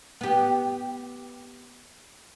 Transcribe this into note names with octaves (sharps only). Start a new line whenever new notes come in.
B3 G4